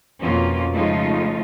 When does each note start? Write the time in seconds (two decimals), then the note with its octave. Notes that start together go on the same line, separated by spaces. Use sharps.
0.21 F2 B2 A#3 C#4 F4
0.74 C#3 F3 G#3 A3 D#4 F4